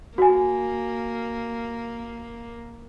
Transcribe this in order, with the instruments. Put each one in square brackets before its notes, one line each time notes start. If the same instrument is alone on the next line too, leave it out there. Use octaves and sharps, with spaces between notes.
[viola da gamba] A#3 [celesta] F#4 G#5